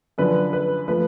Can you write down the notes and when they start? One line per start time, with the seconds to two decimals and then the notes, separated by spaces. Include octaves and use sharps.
0.18 F#2 D3 F3 B4
0.53 B4
0.88 F3 A3 B4